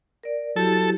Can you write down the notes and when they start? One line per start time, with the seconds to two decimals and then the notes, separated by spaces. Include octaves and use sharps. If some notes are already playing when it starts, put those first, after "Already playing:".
0.23 A#4 D5
0.56 F#3 E4 G4 A4